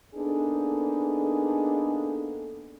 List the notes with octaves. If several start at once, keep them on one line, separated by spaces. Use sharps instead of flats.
A#3 B3 D4 D#4 G#4 A4